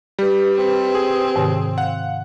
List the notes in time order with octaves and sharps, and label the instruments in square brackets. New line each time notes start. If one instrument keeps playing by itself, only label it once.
[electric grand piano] G3 [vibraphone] G4 B4
[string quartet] C4
[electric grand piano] G#4
[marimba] G#2 C3 D#3
[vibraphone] F5 [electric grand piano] F#5